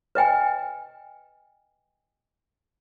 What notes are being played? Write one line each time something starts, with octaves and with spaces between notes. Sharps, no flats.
B4 D#5 G5 G#5